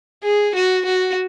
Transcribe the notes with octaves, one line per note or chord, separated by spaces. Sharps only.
G#4
F#4
F#4